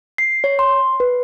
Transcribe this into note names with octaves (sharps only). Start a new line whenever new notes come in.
C7
C#5
C6
B4